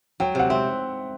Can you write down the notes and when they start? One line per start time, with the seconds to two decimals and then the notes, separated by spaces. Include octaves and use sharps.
0.20 F#3 G5
0.35 C3 F#5
0.50 C4 E5